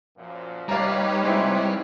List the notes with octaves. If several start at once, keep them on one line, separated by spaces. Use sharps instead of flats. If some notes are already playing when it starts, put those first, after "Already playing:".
F#2 A#2 F3
G3 A#3 D#4 G4 B4 C#5 F5 A#5
G#3 C4 E4